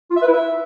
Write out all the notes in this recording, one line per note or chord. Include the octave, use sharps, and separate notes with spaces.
F4
E5
B4
E4
E5